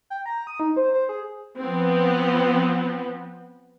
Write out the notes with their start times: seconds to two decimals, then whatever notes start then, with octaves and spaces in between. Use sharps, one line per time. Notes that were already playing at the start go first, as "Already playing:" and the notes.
0.10 G5
0.26 A#5
0.47 D#6
0.60 D#4
0.77 C5
0.94 C5
1.09 G#4
1.59 F3 B3 C4